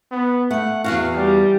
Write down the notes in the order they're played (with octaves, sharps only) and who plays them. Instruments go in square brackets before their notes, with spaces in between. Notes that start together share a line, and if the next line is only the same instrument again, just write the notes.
[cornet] B3
[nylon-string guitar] A3 [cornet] F#5
[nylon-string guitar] E2 G#2 F#4 [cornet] F5
[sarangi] G3